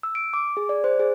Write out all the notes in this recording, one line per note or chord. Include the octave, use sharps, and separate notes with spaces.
E6
D7
D6
G#4
D5
C5
G#4